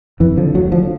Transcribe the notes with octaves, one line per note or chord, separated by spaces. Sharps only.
F2 E3
D3 F3
D2 F#3
D3 F3